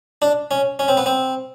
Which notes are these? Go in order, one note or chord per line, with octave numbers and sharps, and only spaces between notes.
D4
C#4
C#4
C4
B3
C4